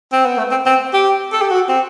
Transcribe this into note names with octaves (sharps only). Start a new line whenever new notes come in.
C4
B3
A3
C4
C4
G4
A4
G4
F#4
C4